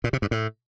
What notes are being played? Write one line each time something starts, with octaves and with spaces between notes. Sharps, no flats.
A#2
C3
G2
A2